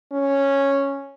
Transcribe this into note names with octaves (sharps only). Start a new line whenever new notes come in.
C#4